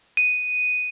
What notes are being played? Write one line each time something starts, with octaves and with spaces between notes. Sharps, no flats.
D#7